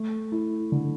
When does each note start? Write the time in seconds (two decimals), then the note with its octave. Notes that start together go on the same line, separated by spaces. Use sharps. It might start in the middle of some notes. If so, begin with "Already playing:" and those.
Already playing: A3
0.32 E4
0.72 D3